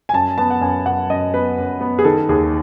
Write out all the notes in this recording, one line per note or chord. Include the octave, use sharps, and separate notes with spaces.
G#5
F#2 A5
B3 A5
F#5
F#2 G#5
F#2 F#5
F#2 D#5
B3 B4
F#2
B3
G#4
D#3 A4
D#2 G#4